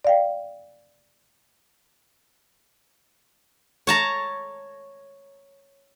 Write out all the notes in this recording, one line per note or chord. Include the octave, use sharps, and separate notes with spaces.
D5 F5 G5
C#5 A5 A#5